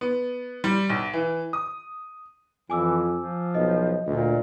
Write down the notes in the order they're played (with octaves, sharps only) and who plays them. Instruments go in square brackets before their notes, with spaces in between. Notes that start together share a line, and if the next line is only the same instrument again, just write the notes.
[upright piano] B3
G3
B1
E3
D#6
[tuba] F2 [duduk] E3 [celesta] G#5 D6 E6
[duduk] F3
[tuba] B1 [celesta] D#5
[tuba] D2 [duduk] A#2